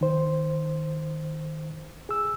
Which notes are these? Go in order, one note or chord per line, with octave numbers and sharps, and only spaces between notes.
D#3 C5
G#4 E6